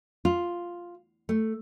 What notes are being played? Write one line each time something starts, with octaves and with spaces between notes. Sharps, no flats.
F4
A3